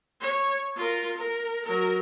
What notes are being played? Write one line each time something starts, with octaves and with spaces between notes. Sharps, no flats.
C#5
F4 A#4
A#4
F#3 A#4